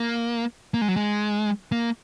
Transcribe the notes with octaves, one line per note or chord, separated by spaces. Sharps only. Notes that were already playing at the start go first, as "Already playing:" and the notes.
Already playing: A#3
A#3
G#3
F#3
G#3
A#3